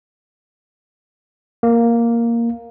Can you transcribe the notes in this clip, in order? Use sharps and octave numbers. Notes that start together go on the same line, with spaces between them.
A#3